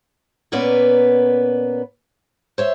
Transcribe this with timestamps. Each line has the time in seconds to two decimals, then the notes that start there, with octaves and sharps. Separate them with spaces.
0.52 A#2 A#3 B3 C#4 B4 D5
2.58 C5 C#5 E5